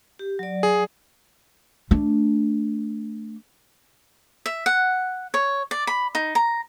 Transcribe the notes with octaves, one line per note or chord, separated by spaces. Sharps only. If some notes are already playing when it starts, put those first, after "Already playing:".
G4
F#3 D5
G#4
A3 D4
E5
F#5
C#5
D5
B5
D#4
A#5